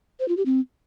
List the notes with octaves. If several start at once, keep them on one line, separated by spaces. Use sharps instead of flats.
C5
F4
G4
C4